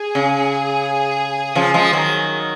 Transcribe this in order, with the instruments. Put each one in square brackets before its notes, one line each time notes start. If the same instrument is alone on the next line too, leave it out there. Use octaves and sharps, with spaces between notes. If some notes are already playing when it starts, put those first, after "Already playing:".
Already playing: [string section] G#4
[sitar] C#3
C#3 F3
F3 G#3
D#3 F#3